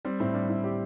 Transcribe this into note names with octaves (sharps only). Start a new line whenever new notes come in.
G3 C4
A2 C4
G3 D4
A2 E4
G3 G4